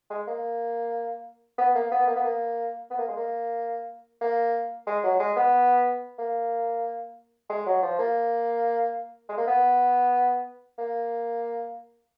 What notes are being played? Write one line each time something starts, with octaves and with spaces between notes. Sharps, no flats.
G#3
A#3
B3
A#3
B3
A#3
B3
A#3
B3
A#3
G#3
A#3
A#3
G#3
F#3
G#3
B3
A#3
G#3
F#3
F3
A#3
G#3
A#3
B3
A#3